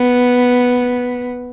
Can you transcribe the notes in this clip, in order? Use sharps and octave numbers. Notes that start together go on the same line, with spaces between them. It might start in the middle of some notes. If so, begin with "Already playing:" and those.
Already playing: B3